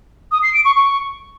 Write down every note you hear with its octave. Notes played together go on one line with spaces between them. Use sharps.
D#6
C7
D7
C#6
C#6